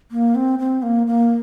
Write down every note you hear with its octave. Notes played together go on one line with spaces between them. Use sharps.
A#3
C4
C4
A#3
A#3